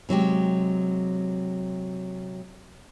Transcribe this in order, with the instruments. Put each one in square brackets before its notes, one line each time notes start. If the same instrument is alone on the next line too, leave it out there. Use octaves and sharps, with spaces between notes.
[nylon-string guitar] C3 F#3 G#3 G4